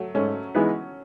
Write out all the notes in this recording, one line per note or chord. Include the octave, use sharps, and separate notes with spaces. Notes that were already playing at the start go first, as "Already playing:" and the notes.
Already playing: F#3 A3
G#2 A3 C#4
E3 G#3 B3 D#4